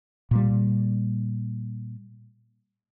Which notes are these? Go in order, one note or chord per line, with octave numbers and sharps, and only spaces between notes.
A#2 G3